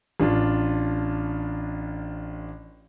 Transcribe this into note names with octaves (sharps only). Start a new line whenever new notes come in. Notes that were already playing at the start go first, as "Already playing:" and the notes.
A1 D4 F4